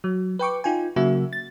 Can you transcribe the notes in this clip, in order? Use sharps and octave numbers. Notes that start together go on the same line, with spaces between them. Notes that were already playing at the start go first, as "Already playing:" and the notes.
F#3
B4 G5 C#6 D6
D#4 F4 G5 G#5
C#3 F#3 A#3 F#4 E5
A6